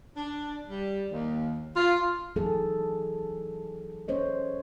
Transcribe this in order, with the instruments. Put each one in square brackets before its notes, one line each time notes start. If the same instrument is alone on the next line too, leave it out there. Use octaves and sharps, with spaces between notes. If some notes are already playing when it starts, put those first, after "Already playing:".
[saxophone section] D4
G3
D#2
F4
[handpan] E3 F#3 G#3 D#4 G#4 A4
C#4 C5 C#5 D#5